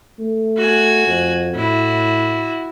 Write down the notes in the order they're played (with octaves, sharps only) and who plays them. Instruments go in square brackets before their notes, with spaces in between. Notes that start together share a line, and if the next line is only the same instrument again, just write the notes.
[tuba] A3
[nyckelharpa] F#4 G#5
[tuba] F2
[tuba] A2 [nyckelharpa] E4 F#4